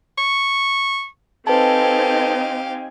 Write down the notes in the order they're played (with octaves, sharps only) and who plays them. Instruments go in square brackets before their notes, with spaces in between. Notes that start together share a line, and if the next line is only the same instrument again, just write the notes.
[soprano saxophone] C#6
[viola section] C4 D#4 G#5 [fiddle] G4 F5 [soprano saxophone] A4 [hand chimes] B4 A5